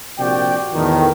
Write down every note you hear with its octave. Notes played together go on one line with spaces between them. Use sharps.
A#1 C3 F#4 D5 G5
E2 A2 D#3